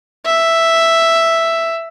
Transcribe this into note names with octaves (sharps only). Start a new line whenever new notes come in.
E5